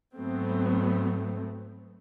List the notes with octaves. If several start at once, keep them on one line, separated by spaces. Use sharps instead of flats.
G#2 F#3 A3 B3 C4